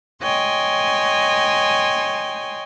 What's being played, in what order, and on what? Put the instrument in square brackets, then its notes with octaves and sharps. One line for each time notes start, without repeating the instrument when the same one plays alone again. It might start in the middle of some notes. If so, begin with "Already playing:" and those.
[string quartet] C#5 D#5 G5 G#5 C6